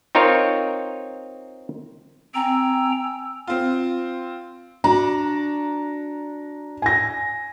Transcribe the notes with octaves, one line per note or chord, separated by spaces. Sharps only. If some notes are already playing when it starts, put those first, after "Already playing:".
C4 D#4 F4 A#4 C#5
C4 G5 G#5 A#5 E6
C4 F4
D4 F#4 A#5
G#5 A#6